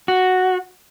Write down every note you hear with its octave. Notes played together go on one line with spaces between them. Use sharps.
F#4